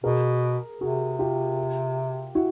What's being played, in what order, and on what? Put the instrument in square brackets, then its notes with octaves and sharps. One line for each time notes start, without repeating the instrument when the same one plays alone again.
[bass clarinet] B2 [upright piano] G#4 A#4
[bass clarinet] C3 [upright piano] F#4 G#4
[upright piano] F4 G4
E4 F#4